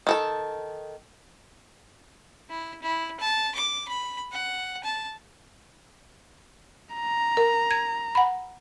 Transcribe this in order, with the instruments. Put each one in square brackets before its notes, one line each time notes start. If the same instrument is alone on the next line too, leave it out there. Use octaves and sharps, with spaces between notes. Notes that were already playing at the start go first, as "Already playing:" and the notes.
[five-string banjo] D#3 A4 A5
[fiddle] E4
E4
A5
D6
B5
F#5
A5
[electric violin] A#5
[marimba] A#4
G#6
F#5 B5